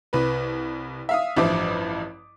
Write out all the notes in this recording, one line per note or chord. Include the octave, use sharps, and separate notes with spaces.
C2 B4
E5 F5 D#6
A1 G2 F3 E5 D6